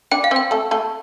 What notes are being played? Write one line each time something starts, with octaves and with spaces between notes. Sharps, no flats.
D4 D5 G5
F5
C4 C5
G5
A3 A4
A3 A4